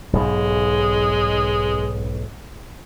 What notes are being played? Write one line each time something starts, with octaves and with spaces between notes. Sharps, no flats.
B1 G#2 B2 G#3